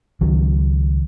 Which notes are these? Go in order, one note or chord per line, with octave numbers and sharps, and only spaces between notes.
C#2 D#3 F#3